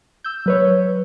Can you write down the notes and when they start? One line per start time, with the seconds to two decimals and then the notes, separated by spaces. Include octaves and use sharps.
0.24 E6 G6
0.46 F#3 B4 C#5